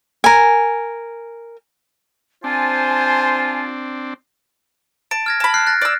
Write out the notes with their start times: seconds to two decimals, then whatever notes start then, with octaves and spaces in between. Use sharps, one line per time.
0.24 A#4 G#5
2.44 C4 D4 F4 C5 G#5 A5
5.11 A5 D7
5.26 F6 G#6 A#6
5.40 A5 B5
5.54 F6 F#6 C7
5.67 F#6 A6 A#6
5.82 D5 E6